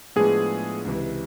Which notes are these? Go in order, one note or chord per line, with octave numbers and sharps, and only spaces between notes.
A2 F3 G#3 B3 D4 G#4
C#2 C3 E3